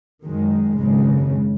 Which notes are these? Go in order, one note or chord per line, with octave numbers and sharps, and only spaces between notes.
F#2 D#3 G#3
G#1 F#2 C#3 G#3